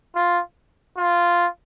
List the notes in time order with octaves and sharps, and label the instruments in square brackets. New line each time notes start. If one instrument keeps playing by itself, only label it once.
[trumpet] F4
F4